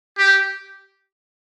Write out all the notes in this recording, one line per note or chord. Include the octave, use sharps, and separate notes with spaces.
G4